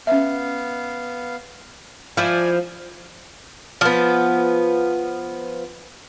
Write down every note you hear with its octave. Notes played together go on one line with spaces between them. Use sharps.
B3 C#4 E5 F5
F3 E4 D5 G#5
F3 B3